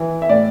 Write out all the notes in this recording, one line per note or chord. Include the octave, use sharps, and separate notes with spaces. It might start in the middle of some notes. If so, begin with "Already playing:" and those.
Already playing: E3
E5
A2 D5